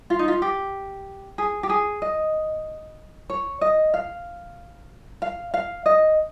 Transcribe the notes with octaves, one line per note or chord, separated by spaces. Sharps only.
F4
D#4
F4
G4
G#4
G4
G#4
D#5
C#5
D#5
F5
F5
F5
D#5